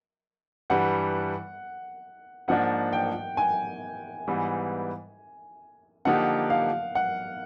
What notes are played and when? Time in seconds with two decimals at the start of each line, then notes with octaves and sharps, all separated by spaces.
0.70 G2 E3 G3 F#5
2.48 G#2 F3 A#3 D4 F#5
2.93 G5
3.37 G#5
4.27 G#2 E3 G3 B3
6.05 D3 F3 A#3 D#4 G4 F#5
6.50 F5
6.95 F#5